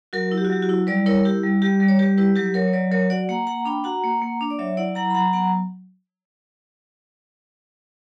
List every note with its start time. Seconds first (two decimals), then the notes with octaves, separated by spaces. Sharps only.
0.13 F#3 F#4 A#4
0.31 E4
0.38 G4
0.45 F#4
0.50 F#3 G4
0.62 F#4
0.69 E4
0.87 G3 B4 D5
1.06 E4 A#4 C#5
1.19 A#4
1.25 E4 G4
1.43 G3
1.62 G3 G4
1.80 G3
1.88 C#5
1.99 G3 G4 B4
2.17 E4 G4 B4
2.36 F#3 G4 B4
2.54 F#3 A#4 C#5
2.68 C#5
2.73 F#3 B4 D5
2.91 F#3 A#4 C#5
3.10 F#4 D5 F#5
3.29 A#3 F#5 A#5
3.47 A#3 F#5 A#5
3.65 D4 G5 B5
3.84 F#4 F#5 A#5
4.04 A#3
4.22 A#3
4.41 D4
4.50 D5
4.59 F#3 C#5 E5
4.77 E4 D5 F#5
4.95 F#3 F#5 A#5
5.10 B5
5.15 F#3 F#5 A#5
5.33 B3 F#5 A#5